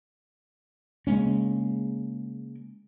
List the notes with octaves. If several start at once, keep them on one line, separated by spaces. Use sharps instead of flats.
C#3 G#3 A#3 C#4